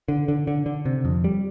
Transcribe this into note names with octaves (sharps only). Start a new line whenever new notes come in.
D3
D3
D3
D3
C3
F2
G3